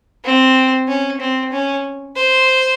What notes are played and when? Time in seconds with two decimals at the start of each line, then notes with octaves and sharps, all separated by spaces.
0.25 C4
0.88 C#4
1.20 C4
1.52 C#4
2.16 C5